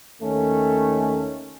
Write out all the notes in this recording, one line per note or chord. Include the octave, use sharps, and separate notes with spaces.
D#2 D#3 A3 C#4